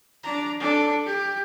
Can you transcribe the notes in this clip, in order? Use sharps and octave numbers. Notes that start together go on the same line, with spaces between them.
D4 A#5
D4 A4
G4